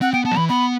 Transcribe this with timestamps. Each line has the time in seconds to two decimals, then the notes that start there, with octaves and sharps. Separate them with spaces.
0.01 C4 F#5
0.13 B3 G5
0.25 B3 A5
0.31 F#3
0.37 E3 B5
0.49 B3 B5